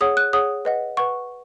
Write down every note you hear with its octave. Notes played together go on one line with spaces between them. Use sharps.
G#4 C#5 F#5 D#6
F#6
G#4 C#5 F#5 D#6
B4 D#5 F#5
B4 F#5 C#6